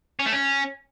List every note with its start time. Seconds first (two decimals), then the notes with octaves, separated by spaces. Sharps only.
0.19 C#4
0.26 A3
0.32 C#4